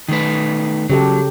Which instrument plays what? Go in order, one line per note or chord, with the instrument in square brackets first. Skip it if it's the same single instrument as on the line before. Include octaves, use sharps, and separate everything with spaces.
[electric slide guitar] D#3 A3 B4
[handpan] C#3 G4 A4 [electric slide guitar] F#3